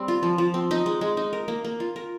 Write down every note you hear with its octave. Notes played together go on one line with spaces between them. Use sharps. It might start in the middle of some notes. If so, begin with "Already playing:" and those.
Already playing: G3 C4
F4
F3
F3
C4
D#4
G#3
G#3
D#4
A#4
A#3
A#3
F4
A#4